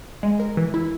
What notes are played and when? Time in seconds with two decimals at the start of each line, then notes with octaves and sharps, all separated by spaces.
0.23 G#3
0.40 A#4
0.57 E3
0.74 E4